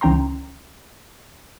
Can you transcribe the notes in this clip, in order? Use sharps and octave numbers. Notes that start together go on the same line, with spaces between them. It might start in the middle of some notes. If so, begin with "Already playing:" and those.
C#2 E3 C#4 G5 A#5 C6